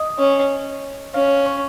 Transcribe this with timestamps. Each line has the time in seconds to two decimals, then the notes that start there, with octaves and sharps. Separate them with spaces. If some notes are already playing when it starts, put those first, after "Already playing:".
Already playing: D#5 D#6
0.19 C#4
1.14 C#4 F5 F6
1.46 C#5 C#6